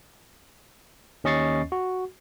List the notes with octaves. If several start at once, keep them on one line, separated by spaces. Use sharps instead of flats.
D#2 C#4 D#5 C#6 A6 C7
F#4